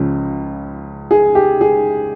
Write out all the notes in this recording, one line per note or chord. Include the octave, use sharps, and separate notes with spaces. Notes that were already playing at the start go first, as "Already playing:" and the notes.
Already playing: C#2 C#3 F3
G#4
G4
G#4